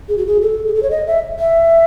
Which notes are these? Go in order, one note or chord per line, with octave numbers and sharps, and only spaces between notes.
G#4
F#4
G#4
A4
G#4
A4
C#5
D#5
E5
E5